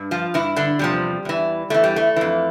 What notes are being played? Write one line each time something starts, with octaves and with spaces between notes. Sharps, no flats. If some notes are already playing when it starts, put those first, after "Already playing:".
Already playing: G2
F3 F4
G2 E3 E4
D3 D4
E2 C3 F3 G3
E2 E3
E2 E3 A3
G3
A3
F2 E3